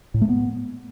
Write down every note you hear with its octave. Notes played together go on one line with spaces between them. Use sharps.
A2
A3
B3